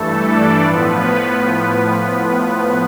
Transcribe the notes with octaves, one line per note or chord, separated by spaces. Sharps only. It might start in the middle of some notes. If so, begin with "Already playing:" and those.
Already playing: G2 E3 A3 A4
D4 D5
A2 F3 B3 B4